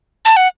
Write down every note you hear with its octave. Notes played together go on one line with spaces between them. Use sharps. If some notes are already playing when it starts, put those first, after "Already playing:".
A5
F#5